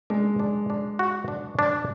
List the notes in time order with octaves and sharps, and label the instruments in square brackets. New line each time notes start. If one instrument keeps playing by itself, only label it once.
[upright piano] G#3 [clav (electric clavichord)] D4
[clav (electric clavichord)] D4
D4
F#4
D4
D4